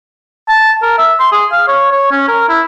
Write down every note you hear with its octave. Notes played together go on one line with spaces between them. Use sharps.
A5
A#4
E5
C6
G#4
F5
C#5
C#5
C#4
A#4
E4